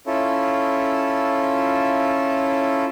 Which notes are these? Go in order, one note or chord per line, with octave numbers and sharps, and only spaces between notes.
C#4 E4 F4 A4